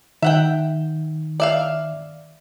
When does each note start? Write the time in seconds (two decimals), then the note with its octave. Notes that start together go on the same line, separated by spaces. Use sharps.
0.22 D#3 E5 F#5 G5
1.40 D5 E5 F5